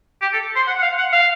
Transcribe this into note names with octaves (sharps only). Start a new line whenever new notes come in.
G4
A4
C5
F#5
F#5
F5
F#5
F5